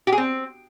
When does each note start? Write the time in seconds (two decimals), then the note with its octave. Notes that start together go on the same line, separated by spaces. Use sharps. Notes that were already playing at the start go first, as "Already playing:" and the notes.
0.07 G4
0.12 G#4
0.18 C4